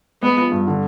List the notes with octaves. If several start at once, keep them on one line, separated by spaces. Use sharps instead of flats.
G#3 B3
F3
G2
D3